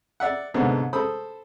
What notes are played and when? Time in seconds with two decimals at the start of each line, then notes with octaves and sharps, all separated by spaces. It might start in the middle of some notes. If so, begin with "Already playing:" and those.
0.20 D5 E5 F#5
0.54 C2 G#2 D3 B3 D4 C5
0.93 A4 C5 B5 D#6